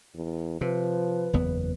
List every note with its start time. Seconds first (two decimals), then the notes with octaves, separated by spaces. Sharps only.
0.15 E2
0.61 C3 F3 B4
1.33 F#1 E2 B3